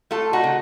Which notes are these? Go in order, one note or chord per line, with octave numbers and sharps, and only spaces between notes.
A3 F4 A4
D#4 F#4
C#3